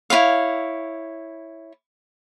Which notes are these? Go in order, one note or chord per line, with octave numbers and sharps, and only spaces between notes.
E4 F4 C#5 F5